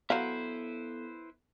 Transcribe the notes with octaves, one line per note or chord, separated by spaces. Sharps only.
F#3 B3 E4 A4 B4 C5 F5